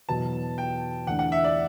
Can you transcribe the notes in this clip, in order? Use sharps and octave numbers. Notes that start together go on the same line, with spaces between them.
E2 B2 F#3 B3 A5
G5
E2 D3 A3 D4 F#5
F#5
E5
D5